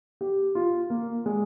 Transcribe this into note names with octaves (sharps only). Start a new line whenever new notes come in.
G4
F4
A#3
G#3